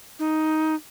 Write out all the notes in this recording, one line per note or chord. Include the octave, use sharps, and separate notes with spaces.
D#4